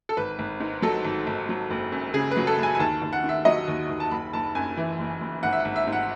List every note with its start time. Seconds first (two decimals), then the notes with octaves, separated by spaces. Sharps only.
0.09 A4
0.17 G#1 B4
0.39 G#1
0.60 G#2
0.82 F#3 A4
1.05 G#1
1.27 G#1
1.49 F#3
1.70 F#1
1.92 F#2
2.14 C#3 G#4
2.31 B4
2.37 F#3
2.47 A4
2.58 F#1 G#5
2.75 G#5
2.79 D#2 A5
3.02 D#2
3.13 F#5
3.24 D#3
3.29 E5
3.45 F#3 D#5
3.68 D#2
3.90 D#2
4.00 A5
4.11 F#1 B5
4.33 F#1 A5
4.55 F#2 G#5
4.77 E3
4.99 F#1
5.21 F#1
5.43 G#1 F#5
5.53 E5
5.60 F#5
5.65 G#1
5.76 E5
5.87 G#2
5.93 F#5